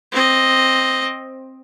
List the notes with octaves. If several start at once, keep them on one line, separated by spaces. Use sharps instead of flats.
C4 D#5